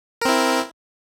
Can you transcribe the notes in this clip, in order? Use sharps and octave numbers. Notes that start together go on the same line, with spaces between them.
C4 E4 A#4